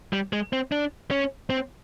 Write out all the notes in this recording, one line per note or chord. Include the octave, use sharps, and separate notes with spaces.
G3
G#3
C4
D4
C#4
C4